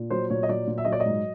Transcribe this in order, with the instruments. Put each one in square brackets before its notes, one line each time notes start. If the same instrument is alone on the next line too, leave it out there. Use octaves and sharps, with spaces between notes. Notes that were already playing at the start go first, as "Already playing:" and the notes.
Already playing: [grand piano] A#2
F#3 C5
A#2 C#5
D#5
F#3 D5
A#2
E5
F#3 D#5
D5
D#5
G#2